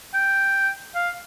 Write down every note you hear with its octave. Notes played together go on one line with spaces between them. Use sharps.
G5
F5